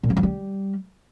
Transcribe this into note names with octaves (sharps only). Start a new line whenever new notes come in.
A#2
E3
F3
G3